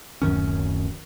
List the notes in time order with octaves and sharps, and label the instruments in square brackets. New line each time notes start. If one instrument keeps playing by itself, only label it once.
[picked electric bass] D1 F#2 D#3 C#4